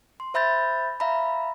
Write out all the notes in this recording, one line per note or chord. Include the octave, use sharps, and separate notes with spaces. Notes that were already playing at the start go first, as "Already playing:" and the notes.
C6
C5 E5 B5 G6 A6
E5 F5 A#5 B5